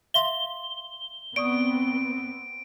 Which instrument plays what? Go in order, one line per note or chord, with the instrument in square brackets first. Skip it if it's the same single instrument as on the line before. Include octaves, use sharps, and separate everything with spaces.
[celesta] E5 F5 C6 [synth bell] G7
[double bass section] B3 C4 [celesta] D5 C#6 D#6 [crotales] D7